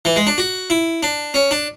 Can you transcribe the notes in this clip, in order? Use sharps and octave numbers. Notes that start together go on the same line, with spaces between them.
E3
G#3
D4
F#4
E4
D4
C#4
D4